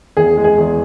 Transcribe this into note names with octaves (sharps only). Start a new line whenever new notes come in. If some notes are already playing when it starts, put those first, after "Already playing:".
E2 G#4
G#3
G#4
E2